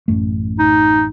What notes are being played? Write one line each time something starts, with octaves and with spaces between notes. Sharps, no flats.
A1 F#2 A3
D#4